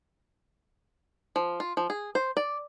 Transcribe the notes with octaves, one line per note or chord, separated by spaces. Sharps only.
F3
F4
F3
G#4
C5
D5